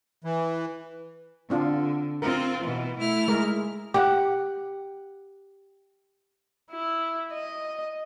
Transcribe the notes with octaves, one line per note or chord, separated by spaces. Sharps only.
E3
D3 C4 D4 F4
C4 F4 A#4
B2 E3
A3 E4 F6
G#3 A#4
G4 F#5
E4
D#5